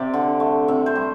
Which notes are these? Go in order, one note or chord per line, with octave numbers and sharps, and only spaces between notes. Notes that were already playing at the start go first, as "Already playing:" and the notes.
Already playing: C3 D5
D3
A3
C3 E5
C5
G3